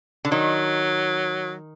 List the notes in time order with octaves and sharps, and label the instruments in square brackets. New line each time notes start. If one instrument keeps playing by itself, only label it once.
[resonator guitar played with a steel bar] D3
[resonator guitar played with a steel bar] D#3 [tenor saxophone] F#3